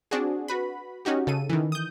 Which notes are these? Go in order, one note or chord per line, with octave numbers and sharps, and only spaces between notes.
C4 D4 F#4 G#4
F#4 B4 B5
C#4 D#4 F#4 G4
C#3 A4 D#7
D#3 E3
D#6 G6